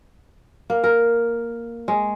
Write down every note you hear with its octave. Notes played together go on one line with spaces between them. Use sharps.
A#3
A#4
G#3